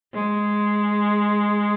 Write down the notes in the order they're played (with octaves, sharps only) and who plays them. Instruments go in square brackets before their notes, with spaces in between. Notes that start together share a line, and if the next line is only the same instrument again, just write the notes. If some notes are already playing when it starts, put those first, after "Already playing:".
[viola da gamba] G#3